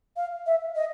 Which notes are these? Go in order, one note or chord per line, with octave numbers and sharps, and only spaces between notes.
F5
E5
D#5